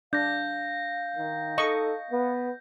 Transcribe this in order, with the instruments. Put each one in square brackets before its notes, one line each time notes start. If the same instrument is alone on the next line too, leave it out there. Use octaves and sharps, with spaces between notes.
[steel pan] D4 [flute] F5 [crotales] G6 A#6
[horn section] D#3
[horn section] D#4 A4 [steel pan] D#5 C#6
[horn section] B3